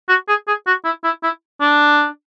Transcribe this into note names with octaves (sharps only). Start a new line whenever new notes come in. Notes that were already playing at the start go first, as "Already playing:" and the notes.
F#4
G#4
G#4
F#4
E4
E4
E4
D4